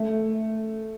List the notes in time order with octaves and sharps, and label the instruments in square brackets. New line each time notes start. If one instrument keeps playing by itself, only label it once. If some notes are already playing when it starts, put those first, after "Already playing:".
Already playing: [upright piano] A3